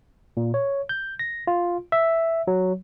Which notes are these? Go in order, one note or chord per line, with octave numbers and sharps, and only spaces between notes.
A#2
C#5
G6
A#6
F4
E5
F#3